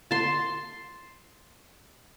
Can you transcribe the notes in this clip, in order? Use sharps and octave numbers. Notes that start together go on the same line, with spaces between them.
A5 C6